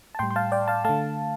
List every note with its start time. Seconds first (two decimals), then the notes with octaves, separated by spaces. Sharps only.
0.15 A5
0.19 A2 G3 G5 C6
0.31 C6
0.36 F5 A5
0.52 D5 G5
0.68 F5 A5
0.85 D3 A3 F5 A5